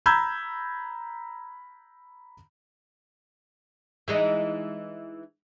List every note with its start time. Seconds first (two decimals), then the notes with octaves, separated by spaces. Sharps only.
0.06 A#5 B5 E6 G6 G#6
4.08 E3 G#3 D#4